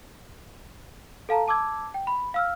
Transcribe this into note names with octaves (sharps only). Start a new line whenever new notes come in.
A4 F5 A5 A#5
A5 D6 E6 G#6
G5
B5
F5 E6 F6